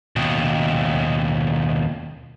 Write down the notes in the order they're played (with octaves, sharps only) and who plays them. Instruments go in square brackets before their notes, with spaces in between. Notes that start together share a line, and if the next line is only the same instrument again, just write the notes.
[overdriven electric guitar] D#2 B2